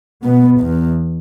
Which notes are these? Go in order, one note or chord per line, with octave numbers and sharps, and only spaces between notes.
B2 B3
E2